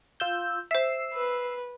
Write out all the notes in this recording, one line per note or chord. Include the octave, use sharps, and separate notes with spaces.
F4 E6 G6
C5 E5 E6 C7
B4